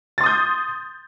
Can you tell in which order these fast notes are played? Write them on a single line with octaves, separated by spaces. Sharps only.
A6 C6 D#6 G6